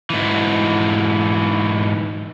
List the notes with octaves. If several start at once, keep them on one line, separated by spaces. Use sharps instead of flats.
G#2 E3